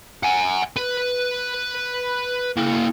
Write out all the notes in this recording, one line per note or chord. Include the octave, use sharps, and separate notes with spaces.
F#5 G#5
B4
A#3 E4